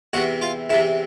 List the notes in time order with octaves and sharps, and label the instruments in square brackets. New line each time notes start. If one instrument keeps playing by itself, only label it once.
[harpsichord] E2 C3 E3 F#4 F#5
F4 F5
E2 C3 E3 E4 E5